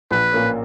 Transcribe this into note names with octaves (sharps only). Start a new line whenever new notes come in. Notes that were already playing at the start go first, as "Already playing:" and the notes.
A#1 B4
A#2 A#3 C#4